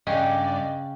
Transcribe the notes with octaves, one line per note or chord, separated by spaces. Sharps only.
G2 C#3 C#4 D5 D#5 G5 F#6